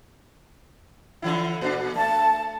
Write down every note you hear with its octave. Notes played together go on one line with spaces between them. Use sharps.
D3 E3 E4
A#2 D4
A3 A5